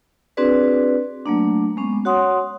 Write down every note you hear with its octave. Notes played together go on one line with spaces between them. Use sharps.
C4 D4 F#4 G#4 B4 D5
F#3 A3 A#3 D4
G#3 B3 C#4
F#4 C#5 F#5 C6 D#6